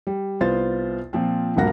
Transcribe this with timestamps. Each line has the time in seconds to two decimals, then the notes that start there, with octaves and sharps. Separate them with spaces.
0.07 G3
0.40 C2 B3 F4 C5 A6
1.13 A#2 F3 C4
1.56 D#1 D2 G2 A#3 F#5 A#6